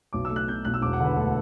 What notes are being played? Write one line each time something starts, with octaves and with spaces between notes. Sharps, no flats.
B1 D6
E6
A3
F#6
B2 G6
B1 F#6
E6
E1 D6
F#5
D3 B4
D2 A4